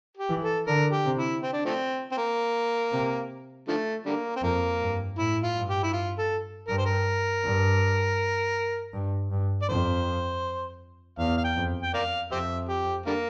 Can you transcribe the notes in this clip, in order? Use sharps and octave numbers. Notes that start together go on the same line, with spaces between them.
G4
E3
A4
D3 A#4
G4
C3
E4
C4
D4
F3 A3 C4
C4
A#3
C3
D3 F3 A3
D3 G3 A#3
C4
F2 A#3
G2
A2 E4
F4
G2
G4
E4
F4
A4
G2 A#4
C5
A#4
G2
G2
G2
D5
F2 C5
E2 F5
F5
G5
F2
G5
A#4 D5 F5
F2 G4 C5 E5
G4
D3 G3 A#3